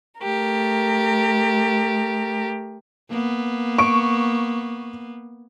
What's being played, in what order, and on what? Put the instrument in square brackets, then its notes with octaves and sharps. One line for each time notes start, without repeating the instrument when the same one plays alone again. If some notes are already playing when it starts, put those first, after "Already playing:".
[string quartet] A3 G4 A#4
[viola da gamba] A#3 B3
[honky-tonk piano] C#6 D7